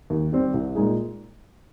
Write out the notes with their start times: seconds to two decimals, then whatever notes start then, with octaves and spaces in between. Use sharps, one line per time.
0.10 D#2
0.32 D#3 G3 C4
0.54 C2
0.75 A#2 G#3 D#4 G#4